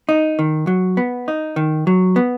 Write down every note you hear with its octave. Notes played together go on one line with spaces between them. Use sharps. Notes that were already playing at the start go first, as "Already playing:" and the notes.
D#4
D#3
F#3
B3
D#4
D#3
F#3
B3